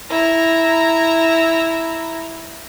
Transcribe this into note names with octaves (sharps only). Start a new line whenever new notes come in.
E4 A#5